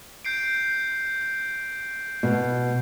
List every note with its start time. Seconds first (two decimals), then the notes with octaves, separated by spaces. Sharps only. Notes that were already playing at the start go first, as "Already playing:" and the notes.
0.25 G6 C7 D7
2.23 B2